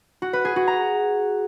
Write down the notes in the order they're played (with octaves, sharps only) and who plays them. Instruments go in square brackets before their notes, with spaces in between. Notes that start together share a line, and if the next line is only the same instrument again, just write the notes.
[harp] F#4
B4
G#4
F#4
A#5